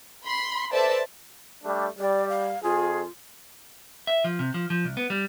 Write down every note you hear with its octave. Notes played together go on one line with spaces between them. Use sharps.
B5 C6
A4 B4 C5 D5 E5 A5
G3 A3 D4
G3 D5
F5
F2 F4 G#4
E5
F3
C3
F3
F3
C2
B3
G3